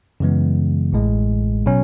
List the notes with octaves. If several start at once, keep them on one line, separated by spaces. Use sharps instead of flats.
F#2 C#3 E3 G#3 B3
A1 A2 G#3
B2 F#3 C#4